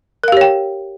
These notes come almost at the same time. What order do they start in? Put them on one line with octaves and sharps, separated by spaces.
A#4 F5 G4 C#5 G5